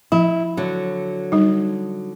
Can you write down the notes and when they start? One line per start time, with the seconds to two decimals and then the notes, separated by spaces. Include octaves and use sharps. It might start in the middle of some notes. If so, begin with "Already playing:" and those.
0.12 F3 E4
0.57 D3 F#3
1.32 G3 D#4